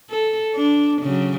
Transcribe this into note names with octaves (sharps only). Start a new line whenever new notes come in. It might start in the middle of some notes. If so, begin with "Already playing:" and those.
A4
D4
C#3 F#3